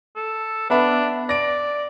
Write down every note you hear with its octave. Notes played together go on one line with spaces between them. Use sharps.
A4
B3 D4 E5 B5
D5 A#6 D7